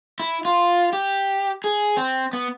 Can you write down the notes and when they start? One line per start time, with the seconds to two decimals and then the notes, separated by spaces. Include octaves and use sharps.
0.20 E4
0.45 F4
0.93 G4
1.64 G#4
1.97 C4
2.33 B3